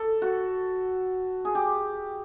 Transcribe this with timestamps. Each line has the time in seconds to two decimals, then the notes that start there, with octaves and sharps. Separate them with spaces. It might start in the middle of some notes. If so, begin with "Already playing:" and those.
Already playing: A4
0.22 F#4
1.45 G#4
1.55 G4